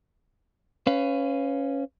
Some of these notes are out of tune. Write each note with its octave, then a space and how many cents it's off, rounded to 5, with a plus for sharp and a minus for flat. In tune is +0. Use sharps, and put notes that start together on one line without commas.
C#4 +0 B4 +25 F5 +0